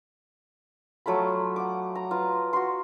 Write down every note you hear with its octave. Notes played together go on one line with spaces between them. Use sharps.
F#3 A3 F4 B5
F#5 D6
A#5
F4 B4
F#4 C6